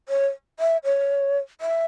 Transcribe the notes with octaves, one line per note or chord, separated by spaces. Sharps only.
C#5
E5
C#5
E5